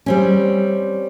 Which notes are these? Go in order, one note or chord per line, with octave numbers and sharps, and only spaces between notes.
G3 C4 C#4